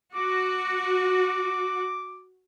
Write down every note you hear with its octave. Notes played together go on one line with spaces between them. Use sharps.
F#4 D6